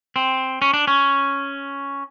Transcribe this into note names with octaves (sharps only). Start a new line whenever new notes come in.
C4
C#4
D4
C#4